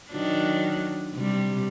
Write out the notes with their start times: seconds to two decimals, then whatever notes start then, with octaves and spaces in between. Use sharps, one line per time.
0.11 D#3 F#3 D4
1.15 C3 G3